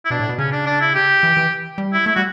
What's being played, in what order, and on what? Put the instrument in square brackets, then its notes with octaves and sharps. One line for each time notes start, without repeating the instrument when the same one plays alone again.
[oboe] E4
[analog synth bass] B2 [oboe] D4
[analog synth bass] A2
B2
[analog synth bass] C#3 [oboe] C#4
[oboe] D4
D4
E4
G4
[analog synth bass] E3
E3
G3
[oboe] E4
[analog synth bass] A3 [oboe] E4
[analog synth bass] G3 [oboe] F#4